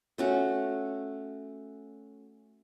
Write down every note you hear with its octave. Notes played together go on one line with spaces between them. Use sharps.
A3 C#4 F#4